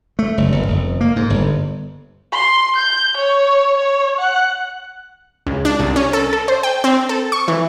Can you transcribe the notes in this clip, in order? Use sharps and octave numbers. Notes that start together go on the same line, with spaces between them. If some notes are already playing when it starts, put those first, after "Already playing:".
A3
F#1
G1
F1
A#3
G#2
G1
C6
G6
C#5
C#5
F#5
C#2
D4
C2
C#4
A4
A4
C5
G5
C4
A4
C#6
E3